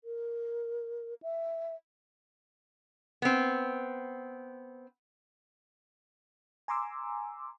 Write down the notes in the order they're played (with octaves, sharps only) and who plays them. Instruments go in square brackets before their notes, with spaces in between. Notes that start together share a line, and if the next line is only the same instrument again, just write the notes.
[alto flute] A#4
E5
[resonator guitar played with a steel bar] B3 C4
[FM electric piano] G#5 A#5 C6 D6 E6